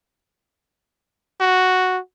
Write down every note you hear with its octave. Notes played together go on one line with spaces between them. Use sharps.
F#4